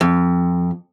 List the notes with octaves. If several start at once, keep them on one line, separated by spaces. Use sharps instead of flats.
F2